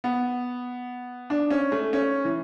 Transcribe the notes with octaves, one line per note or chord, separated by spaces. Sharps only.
B3
D4
C#4
A3
C#4
E3